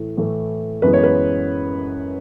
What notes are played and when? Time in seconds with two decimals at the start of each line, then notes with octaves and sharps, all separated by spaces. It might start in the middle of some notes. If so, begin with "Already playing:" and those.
Already playing: A2 E3 A3
0.17 A2 E3 A3
0.82 F#2 E3 G#3 B3 B4
0.93 C#5
1.04 B4